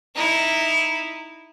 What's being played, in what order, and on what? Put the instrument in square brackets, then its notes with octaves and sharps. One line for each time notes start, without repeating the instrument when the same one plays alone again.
[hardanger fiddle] D#4 E4